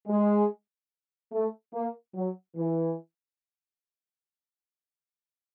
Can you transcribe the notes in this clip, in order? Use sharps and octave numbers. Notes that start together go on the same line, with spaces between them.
G#3
A3
A#3
F#3
E3